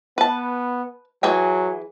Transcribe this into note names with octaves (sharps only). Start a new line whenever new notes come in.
B3 B4 A5
E3 F#3 G#4 G5